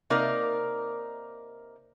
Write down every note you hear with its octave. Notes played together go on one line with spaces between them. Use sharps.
C3 A#3 D#4 A#4 D5